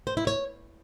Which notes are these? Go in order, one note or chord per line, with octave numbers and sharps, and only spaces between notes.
C5
E4
C#5